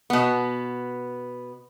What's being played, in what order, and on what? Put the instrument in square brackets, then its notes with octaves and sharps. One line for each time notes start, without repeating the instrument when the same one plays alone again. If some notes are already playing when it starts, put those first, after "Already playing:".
[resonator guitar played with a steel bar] B2 B3